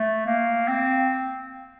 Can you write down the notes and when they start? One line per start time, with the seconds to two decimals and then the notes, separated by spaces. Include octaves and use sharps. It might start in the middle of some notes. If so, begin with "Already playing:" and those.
Already playing: A3
0.26 A#3
0.68 C4